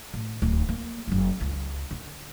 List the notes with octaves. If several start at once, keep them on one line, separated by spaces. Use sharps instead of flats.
A2
D1 D#2
A#3
F#1 F#3
C#2
D3